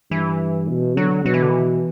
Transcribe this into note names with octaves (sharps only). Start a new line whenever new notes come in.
G2 E3
B2
D3 F#3
B2 F#3
E3
D3
E3